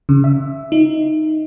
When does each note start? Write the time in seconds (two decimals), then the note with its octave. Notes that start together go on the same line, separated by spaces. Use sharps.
0.09 C#3
0.24 E5
0.72 D#4